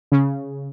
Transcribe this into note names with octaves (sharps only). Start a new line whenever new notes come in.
C#3